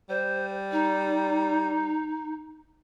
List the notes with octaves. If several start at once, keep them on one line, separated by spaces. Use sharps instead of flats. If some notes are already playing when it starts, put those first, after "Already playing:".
G3 C5
D#4